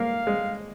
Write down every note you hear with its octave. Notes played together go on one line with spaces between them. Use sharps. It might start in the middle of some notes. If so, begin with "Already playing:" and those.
Already playing: A#3 F5
G#3